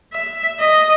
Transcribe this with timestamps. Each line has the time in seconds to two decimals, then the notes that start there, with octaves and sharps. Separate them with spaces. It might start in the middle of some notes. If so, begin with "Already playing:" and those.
0.13 E5
0.60 D#5